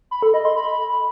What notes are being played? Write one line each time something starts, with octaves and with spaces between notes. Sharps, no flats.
B5
A4
D#5
C6
B5